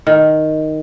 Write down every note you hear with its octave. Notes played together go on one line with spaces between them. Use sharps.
D#3